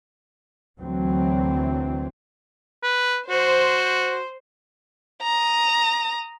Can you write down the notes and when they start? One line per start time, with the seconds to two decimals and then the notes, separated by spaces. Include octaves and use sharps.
0.79 D2 E3 F#3 C4
2.83 B4
3.30 F#4 C5
5.22 A#5 D#6